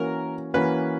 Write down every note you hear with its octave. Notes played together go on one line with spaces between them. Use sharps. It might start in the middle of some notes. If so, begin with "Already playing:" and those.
Already playing: E3 A#3 C#4 F#4 A#4
E3 A#3 C#4 F#4 B4